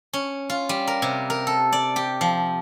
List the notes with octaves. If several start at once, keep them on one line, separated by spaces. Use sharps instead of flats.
C#4
F4
G3
A#4
C3
A#4
A4
D5
G4
F3